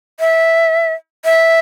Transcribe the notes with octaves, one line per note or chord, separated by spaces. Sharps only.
E5
E5